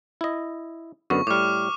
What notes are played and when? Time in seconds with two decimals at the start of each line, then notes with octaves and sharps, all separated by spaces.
0.21 E4 D#5
1.10 F#2 D3 B3 C#6
1.27 A2 G3 D6 F6